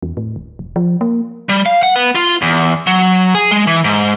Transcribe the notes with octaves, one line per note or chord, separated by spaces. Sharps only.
E2
A2
D1
E1
F3
A#3
G3
F5
F#5
B3
F4
E2
F#3
G#4
G#3
E3
G#2